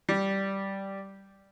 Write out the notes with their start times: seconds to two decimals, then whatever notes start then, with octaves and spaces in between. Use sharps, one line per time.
0.09 G3